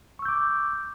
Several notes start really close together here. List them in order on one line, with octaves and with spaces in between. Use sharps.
C#6 E6 G6 D6